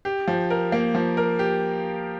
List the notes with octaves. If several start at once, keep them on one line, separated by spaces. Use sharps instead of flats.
G4
F3
A#4
A#3
F3
A#4
G4